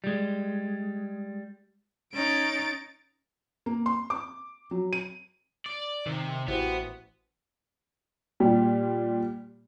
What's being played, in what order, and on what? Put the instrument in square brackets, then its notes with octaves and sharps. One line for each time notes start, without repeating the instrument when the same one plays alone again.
[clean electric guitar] G3 G#3
[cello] C#4 D#4 [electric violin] A6 D7
[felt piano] A#3
C6
D6
F#3
D#7
[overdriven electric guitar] D5
[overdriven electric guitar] C3 [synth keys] D#3
[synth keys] A1 E3 [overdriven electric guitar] B3 [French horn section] F#4 G4 C5
[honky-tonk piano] A#2 G3 G4